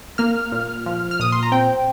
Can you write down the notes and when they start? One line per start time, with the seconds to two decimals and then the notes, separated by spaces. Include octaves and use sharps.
0.18 A#3 F6
0.52 A#2
0.86 F3
1.11 F6
1.20 A#2 D#6
1.32 C6
1.43 A#5
1.52 C4 G5